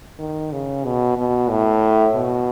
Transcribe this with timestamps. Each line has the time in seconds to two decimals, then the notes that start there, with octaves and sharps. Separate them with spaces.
0.19 D#3
0.51 C#3
0.84 B2
1.18 B2
1.49 A2
2.15 B2